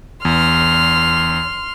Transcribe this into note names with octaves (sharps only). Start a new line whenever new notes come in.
E2 C6 F6